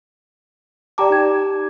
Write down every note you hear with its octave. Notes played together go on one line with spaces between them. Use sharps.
G4 D5 G5 A5 A#5 D6
D#4 G#6